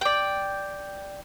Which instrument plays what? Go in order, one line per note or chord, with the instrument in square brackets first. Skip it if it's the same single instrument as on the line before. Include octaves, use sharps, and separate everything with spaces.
[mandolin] D5 G5